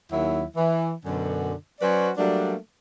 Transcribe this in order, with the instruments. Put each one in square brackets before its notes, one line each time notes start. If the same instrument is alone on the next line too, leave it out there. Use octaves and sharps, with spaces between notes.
[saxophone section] D#2 F#3 E4
E3
F#2 B2 D3
F#3 C#4 F#4 B4 C5 D5
F#3 G3 A3 A#3 D4